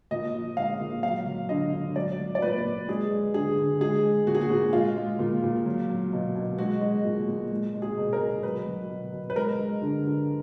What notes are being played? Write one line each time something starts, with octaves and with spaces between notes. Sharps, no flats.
A#2 D#5
F3
G#3 F5
A#2
F#3 F5
F#3
D3 D#5
D3
F#3 D5
F#3
D5
A#2 B4
A#2
G#3 G#4
G#3
D3 G#4
D3
G#3 G#4
G#3
A#2 F#4
G#4
F#4
A#2
G#3 F4
G#3
A#2
A#2
F#3
F#3
B2
B2
G#3 F#4
G#3
A#2
A#2
G#3
G#3
G#4
B2
A#4
B2
F#3 B4
F#3
B2
B2
B4
G#3 A#4
G#3
D3
D3